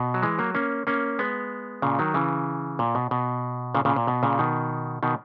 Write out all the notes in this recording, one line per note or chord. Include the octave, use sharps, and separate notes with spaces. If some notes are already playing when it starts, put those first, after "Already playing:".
Already playing: B2
F#3
E3 G#3
F#3 A#3
A#3 C#4
A#3 C#4
G#3 B3
A#2 C#3
D#3 F#3
C#3 E3
A#2
B2
B2
A#2 C#3
A#2 C#3
A#2
B2
A#2 C#3
B2 D#3
B2 D#3